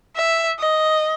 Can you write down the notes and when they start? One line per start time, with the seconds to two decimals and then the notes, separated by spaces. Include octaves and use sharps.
0.16 E5
0.59 D#5